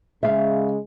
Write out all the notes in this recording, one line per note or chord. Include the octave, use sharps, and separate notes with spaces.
C#3 G#3 E5 F5